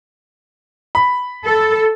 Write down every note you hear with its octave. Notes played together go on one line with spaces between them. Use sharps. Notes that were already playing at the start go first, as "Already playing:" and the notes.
B5
A4